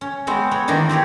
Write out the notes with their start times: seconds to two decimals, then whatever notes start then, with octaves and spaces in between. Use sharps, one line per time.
0.01 C#4
0.27 G#3 B3 C4 F#4
0.51 B3 C#5
0.68 D#3 E3 A#3 D4 D#4
0.89 C4 G4 G#4 C#5